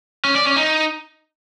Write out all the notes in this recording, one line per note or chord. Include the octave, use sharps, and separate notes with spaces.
C#4
D5
C#4
D#4